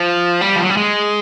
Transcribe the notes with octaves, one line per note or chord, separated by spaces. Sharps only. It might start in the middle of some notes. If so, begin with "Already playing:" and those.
Already playing: F3
G3
F3
F#3
G3
G#3